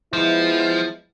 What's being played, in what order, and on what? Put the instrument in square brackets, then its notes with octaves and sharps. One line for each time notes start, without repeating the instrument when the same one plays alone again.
[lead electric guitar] F3 [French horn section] G#3 B3 E4